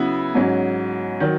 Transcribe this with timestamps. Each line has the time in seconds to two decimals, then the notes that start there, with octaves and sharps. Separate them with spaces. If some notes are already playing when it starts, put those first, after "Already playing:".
Already playing: C#3 F#3 B3 E4
0.35 G#2 F#3 C#4
1.20 D#3 F#3